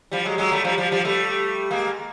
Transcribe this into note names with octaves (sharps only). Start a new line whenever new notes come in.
F3 G3
F#3 G#3
F#3 G#3
G3 A3
F3 G3
F3 G3
F3 G3
G3 A3
G#3 A#3